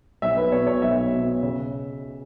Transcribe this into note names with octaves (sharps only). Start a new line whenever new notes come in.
B1 E5
B4
B2 C#5
C#5
B1 E5
B2
C#3